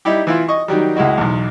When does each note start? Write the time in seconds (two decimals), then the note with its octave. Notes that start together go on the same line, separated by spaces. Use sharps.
0.05 G3 D#4 E4 G4
0.27 E3 E4 F4
0.48 D#5 C#6 D#6
0.68 D#3 F#3 G3
0.96 C#2 G#3 E4 F#4 D#5
1.18 B1 E2